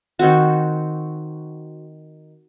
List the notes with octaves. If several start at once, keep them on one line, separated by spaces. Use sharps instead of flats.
D#3 C4 F#4